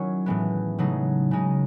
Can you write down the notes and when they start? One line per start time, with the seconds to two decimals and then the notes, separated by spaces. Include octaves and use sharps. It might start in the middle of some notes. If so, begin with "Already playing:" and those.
Already playing: D#3 F#3 C#4 E4 C#5
0.26 A2 E3 G#3 B3
0.78 C#3 F#3 A3 D#4
1.31 C#3 G#3 D#4